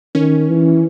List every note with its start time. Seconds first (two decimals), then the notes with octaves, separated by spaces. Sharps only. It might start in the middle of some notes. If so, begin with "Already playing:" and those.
0.15 D#3 C#4
0.49 E3